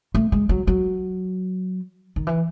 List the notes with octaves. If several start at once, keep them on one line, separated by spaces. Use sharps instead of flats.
A3
G#3
F#3
F#3
D#3
E3